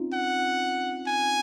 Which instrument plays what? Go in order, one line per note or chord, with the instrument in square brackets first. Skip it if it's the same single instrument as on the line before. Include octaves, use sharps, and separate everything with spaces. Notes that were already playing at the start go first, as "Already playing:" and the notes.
Already playing: [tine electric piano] C4 C#4 D#4 F4
[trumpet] F#5
G#5